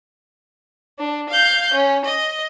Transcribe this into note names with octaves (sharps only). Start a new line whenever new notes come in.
D4
F5 G6
C#4
D#5